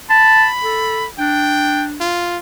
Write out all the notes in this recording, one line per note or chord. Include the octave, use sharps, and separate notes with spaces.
A5 B5
A4
D4 G5
F4